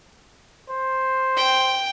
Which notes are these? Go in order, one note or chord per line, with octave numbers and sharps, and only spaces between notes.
C5
G5